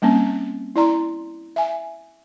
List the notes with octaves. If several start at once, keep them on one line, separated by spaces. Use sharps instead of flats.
G3 A#3 C4 C#4
E4 D5 A#5 C6
E5 G#5